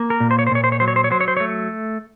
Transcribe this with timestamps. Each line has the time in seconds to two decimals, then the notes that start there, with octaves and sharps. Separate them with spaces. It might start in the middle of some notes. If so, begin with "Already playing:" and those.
Already playing: A#3
0.10 A#4
0.20 A#2
0.31 C5
0.39 C#5
0.47 C5
0.51 A#2 C#5
0.64 C5
0.72 C#5
0.80 F#3 C5
0.88 C#5
0.96 C5
1.04 C#5
1.11 F#3 C5
1.21 C#5
1.28 C5
1.37 C#5
1.40 A3